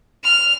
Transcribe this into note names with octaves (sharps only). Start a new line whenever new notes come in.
F6